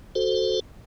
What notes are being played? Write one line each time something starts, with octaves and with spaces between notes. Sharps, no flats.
F#4 A4 C5